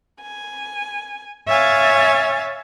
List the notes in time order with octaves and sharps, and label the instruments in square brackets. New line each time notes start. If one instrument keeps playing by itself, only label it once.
[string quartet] G#5
C#5 E5 F5 G#5 A6